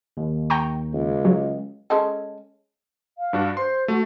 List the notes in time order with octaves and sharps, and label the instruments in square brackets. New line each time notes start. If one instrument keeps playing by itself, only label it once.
[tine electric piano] D#2
[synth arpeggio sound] G5 A#5 C#6
[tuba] C#2
[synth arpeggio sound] F#3 [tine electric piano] G#3
[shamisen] G#3 C#4 A4
[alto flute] F5
[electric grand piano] G2 D4 F#4
[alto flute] C5 [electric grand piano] C6
[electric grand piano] A3 [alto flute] F#4